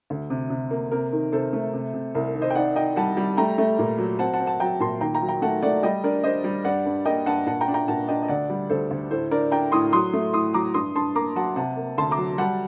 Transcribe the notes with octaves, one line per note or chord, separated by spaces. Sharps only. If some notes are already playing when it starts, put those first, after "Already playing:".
D2
C3
C3
A#3
C3 A#4
D#3
C3 A4 C5
A3
C3
C3
C2 A#4
D#3
C5 D#5
G5
D#4 D5 F#5
D#4 D#5 G5
G3 F#5 A5
G3
A3 G5 A#5
A3
A#2
F#3
C4 F#5 A5
F#5 A5
C4
F#5 A5
F#3 G5 A#5
A#2 A5 C6
D#2 G5 A#5
G5 A#5
F#3
G5 A#5
A3 F#5 A5
A3 D5 F#5
G3 D#5 G5
D4 A#4 D5
D4 C5 D#5
G3
G2 D5 F#5
G2
A#3 D#5 G5
G2 F#5 A5
A#2 F#5 A5
G5 A#5
D4
G5 A#5
A#2 F#5 A5
D4 D#5 G5
D#5
D2 D5 F#5
G3
D2 A4 C5
D2
A2 A4 C5
D4 A#4 D5
D4 G5 A#5
A2 C6 D#6
F#3 C6 D#6
A3
A2 C6 D#6
F#3 A#5 D6
G2 C6 D#6
G2 A5 C6
A#3 A#5 D6
F#3 F#5 A5
C3 F#5 A5
A#3
D2 A5 C6
A#5 D6
F#3
G3 F#5 A5